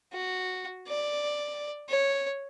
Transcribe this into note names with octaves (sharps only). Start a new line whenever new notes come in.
F#4
D5
C#5